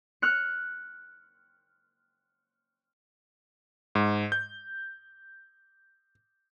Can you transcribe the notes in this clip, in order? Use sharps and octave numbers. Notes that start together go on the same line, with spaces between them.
F6 F#6 C#7
G#2
G6